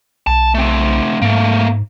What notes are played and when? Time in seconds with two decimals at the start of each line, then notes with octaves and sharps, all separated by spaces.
0.27 B1 A5
0.55 A3 C4
1.22 G#2 A3 A#3